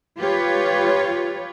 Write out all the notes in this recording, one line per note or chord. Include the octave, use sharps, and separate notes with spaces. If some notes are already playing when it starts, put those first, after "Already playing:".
F4 G4 B4 C#5